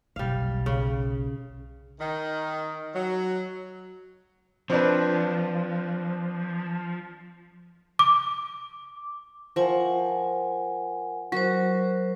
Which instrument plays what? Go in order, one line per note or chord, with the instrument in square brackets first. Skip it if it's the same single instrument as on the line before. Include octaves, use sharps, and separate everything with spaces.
[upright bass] F#1 B1 [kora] G3 F5
[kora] C#3
[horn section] D#3
F#3
[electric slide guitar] F3 [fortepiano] C4 D4 B4
[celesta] D6
[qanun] F3 C#6 [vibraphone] A#4 F#5 G#5
[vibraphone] F#3 A#4 C5 [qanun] F#4